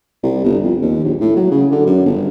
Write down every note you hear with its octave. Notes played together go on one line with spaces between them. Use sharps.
C2
G1
F2
D#2
A#1
A2
F#3
C#3
D3
F#2
G1